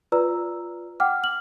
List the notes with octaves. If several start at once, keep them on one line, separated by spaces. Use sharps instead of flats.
F4 B4 D5 A#5 E6
F#5 G5 D6 F6
F6 F#7